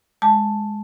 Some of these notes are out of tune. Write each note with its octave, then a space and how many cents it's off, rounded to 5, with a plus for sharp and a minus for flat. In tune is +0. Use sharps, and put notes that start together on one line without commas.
G#3 +0 A5 +0